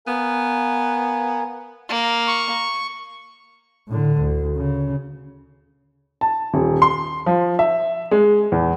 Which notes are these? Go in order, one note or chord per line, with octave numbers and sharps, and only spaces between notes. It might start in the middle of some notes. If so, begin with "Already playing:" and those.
B3 A#4 F5 G#5
A#3
C#6
A2 D3
D2
C#3
A5
D#1
C6
F3
E5
G#3
E2